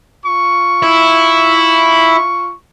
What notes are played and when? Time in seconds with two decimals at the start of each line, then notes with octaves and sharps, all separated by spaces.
0.25 F4 C#6
0.82 E4